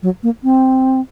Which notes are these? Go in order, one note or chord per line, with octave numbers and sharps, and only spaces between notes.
F#3
A#3
C4